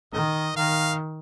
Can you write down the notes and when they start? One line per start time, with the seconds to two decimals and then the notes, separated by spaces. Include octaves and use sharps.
0.13 D#3 D#5
0.56 D#3 F5